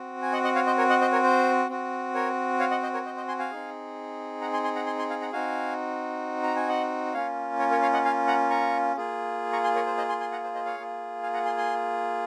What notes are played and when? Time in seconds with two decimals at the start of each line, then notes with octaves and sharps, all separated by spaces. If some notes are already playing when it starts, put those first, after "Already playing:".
Already playing: C4 F#4
0.22 G#5
0.33 D#5 F#5
0.44 D#5 F#5
0.55 C#5 F5
0.67 C5 D#5
0.78 A#4 C#5
0.89 D#5 F#5
1.01 C5 D#5
1.12 A#4 C#5
1.24 C5
1.69 C4 F#4
2.15 A#4 C#5
2.60 C#5 F5
2.71 D#5 F#5
2.83 C5 D#5
2.94 A#4 C#5
3.05 C5 D#5
3.16 C5 D#5
3.28 G#5 C6
3.39 F5 G#5
3.51 C4 D#4 G#4
4.41 F#5 A#5
4.53 G#5 C6
4.64 G#5 C6
4.76 F#5 A#5
4.86 G#5 C6
4.99 G#5 C6
5.10 F5 G#5
5.21 F#5 A#5
5.32 C4 D#4 F#4 F5 G#5
6.43 A#5
6.56 G#5
6.69 D#5 F#5
7.14 A#3 C#4 F4 C#5 F5
7.59 A#4 C#5
7.71 A#4 C#5
7.82 C#5 F5
7.93 D#5 F#5
8.05 F5 G#5
8.27 F#5 A#5
8.50 A#5 C#6
8.96 A#3 F4 G#4
9.53 A#5 C#6
9.64 G#5 C6
9.75 A#4 C#5
9.87 C5
9.97 C5 D#5
10.09 G#5 C6
10.20 G#5 C6
10.32 F#5 A#5
10.44 C5
10.55 C5 D#5
10.66 C#5 F5
10.78 A#3 F4 G#4
11.23 F5 G#5
11.34 F#5 A#5
11.45 G#5 C6
11.57 G#5 C6